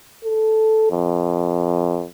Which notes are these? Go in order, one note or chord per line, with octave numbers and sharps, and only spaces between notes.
A4
F2